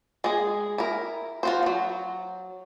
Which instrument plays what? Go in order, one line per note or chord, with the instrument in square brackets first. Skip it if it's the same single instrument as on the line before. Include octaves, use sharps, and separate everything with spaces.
[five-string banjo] G#3 G#4
E4 A#4
F4 F#4 C5
F3 F#3